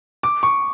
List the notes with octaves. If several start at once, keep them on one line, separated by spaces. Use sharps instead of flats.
D6
C#6